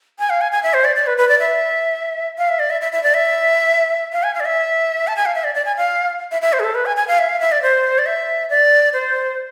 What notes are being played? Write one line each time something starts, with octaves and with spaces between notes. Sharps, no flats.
G#5
F5
G#5
G#5
E5
C5
D5
D5
B4
B4
D5
E5
F5
E5
D5
E5
E5
E5
D5
E5
F5
G#5
F5
D5
E5
A5
G#5
F5
E5
D5
D5
G#5
F5
E5
E5
C5
G#4
A4
B4
G#5
G#5
F5
E5
F5
E5
D5
C5
D5
E5
D5
C5